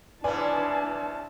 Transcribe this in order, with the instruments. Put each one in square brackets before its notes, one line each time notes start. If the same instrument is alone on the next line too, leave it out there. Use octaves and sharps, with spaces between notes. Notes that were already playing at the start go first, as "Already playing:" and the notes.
[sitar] G#2 C#3 E4 [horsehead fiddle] D4 A5 [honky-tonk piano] B4 D5 G#5